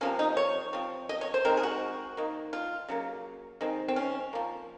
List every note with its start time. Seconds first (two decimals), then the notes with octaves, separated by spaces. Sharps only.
0.01 C3 F3 A#3 C#4
0.19 D#4
0.37 C#5
0.73 F3 C4
1.09 D#5
1.21 C#5
1.34 C5
1.45 D#3 G#3 C4 A#4
1.57 G#4
1.63 F#4
2.17 D#3 A#3
2.53 F4
2.88 C#3 F#3 A#3
3.61 D#3 G#3 C4
3.88 C4
3.96 C#4
4.33 F3 A#3